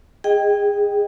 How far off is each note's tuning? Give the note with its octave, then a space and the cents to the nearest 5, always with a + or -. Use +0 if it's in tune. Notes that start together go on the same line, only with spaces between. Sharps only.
G#4 -20 D#5 +0 G5 +0